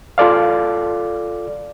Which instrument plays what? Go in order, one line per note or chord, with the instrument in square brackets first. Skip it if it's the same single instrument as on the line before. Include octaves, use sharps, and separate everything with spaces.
[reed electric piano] F4 A4 D5 F5